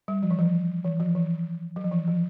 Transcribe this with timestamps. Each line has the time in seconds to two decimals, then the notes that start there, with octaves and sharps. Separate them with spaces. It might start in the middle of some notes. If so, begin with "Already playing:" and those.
0.08 G3
0.23 F3
0.31 E3
0.39 F3
0.84 E3
1.00 F3
1.15 E3
1.76 F#3
1.84 F3
1.92 E3
2.08 F3